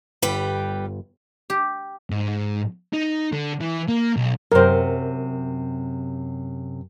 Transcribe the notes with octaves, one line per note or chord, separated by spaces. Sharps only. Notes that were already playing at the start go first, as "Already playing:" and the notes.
G1 G3 B4 G5
G4
G#2
D#4
D3
E3
A#3
B1
F#2 C3 A#4 C5